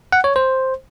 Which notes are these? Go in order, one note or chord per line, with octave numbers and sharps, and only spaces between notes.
F#5
C#5
C5